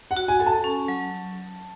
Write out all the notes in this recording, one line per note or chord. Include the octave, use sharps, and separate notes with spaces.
F#5
F#4
G#5
A4 G#5
A5
C#4
F#3